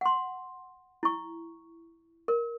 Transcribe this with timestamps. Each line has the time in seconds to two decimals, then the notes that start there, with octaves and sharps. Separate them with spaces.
0.01 F#5 C6
1.03 E4 C#6
2.28 A#4